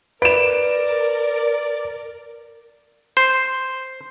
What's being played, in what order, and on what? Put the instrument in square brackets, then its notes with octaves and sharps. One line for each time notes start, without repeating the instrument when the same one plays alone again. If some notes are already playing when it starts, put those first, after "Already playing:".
[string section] A#4 [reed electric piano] B4 [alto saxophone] D5 [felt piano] D7 E7
[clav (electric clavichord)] C5